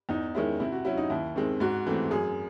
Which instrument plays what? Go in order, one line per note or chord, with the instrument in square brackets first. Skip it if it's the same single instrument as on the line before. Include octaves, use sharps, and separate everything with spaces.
[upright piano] E2 D#4
D#3 G#3 C#4 E4
C3 E4
F#4
F#3 C#4 E4
D#4
D#2 E4
D#3 G#3 C4
G#2 F#4
E3 A3 C4
F#2 G#4